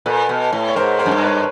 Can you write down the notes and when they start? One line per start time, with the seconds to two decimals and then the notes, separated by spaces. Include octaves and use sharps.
0.06 A#2 A4 B4
0.29 B2
0.53 A2
0.68 C#5
0.75 G#2 A#4 C5
0.99 A#4 C5
1.06 F#2
1.11 G2
1.22 B4 C#5